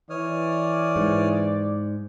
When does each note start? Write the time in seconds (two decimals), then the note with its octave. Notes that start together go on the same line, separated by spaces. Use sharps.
0.10 E3 C#5 D5 D#6 F6
0.96 G#2